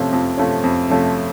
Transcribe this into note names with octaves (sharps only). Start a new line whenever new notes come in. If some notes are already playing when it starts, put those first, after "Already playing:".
Already playing: F2 C3 F3 A3 C#4
F2
C3 F3 A3 C#4
F2
C3 F3 A3 C#4